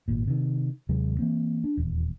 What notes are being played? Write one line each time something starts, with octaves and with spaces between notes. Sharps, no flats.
G#1 A#2
C3 D#3
D#2 C3 F#3 G#3
E3 A#3 C4
D4
D#1 E2